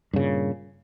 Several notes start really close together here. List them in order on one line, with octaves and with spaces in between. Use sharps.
G2 C#3 A#2